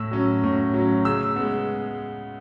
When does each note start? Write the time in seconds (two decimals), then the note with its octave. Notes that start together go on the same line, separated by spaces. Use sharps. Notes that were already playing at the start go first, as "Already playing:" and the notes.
Already playing: A2 E6
0.11 F#3 C#4
0.43 A2
0.74 F#3
0.79 C#4
1.05 C#3 E6
1.36 G#3 B3